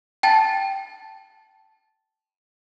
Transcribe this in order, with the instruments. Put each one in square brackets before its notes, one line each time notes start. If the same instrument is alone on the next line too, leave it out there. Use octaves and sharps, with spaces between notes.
[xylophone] G5 A5 A6